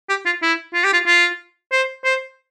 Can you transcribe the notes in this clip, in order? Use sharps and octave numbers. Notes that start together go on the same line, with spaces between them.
G4
F4
E4
F4
G4
F4
F4
C5
C5